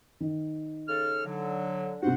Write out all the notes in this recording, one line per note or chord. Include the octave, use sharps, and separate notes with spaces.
D#3
C#3 A4 F6
D3 F#3
G2 C3 F#4 C5 F#5